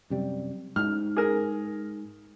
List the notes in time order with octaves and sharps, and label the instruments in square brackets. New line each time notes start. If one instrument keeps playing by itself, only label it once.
[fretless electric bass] F#2 C3 G3
[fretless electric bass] G#2 [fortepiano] F6
[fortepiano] G#4 A#4